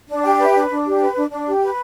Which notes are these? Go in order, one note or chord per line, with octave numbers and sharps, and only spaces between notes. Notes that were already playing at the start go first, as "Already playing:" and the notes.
D4
G4 D5 G5
B4
E5
D4
D4
G4
B4
D4
D4
G4
B4